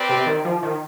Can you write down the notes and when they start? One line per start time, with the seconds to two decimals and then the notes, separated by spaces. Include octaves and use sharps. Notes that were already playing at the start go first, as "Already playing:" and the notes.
Already playing: C4 G4 B4 D5
0.09 C3
0.26 D#3
0.45 F3
0.63 D#3